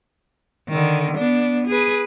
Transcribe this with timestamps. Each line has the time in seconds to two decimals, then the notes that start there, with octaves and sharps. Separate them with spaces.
0.69 D3 D#3
1.17 B3 D4
1.67 G#4 B4